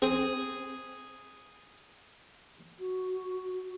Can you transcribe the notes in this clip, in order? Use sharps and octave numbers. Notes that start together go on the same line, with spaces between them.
C4 G#4
F#4